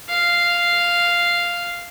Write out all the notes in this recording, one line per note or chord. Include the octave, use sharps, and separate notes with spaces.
F5